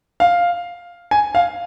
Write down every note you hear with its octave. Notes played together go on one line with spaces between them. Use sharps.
F5
G#5
F5